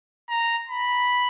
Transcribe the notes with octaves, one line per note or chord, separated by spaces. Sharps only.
A#5
B5